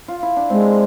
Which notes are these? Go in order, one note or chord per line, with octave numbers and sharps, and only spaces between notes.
F4
E4
D4
G#3 C4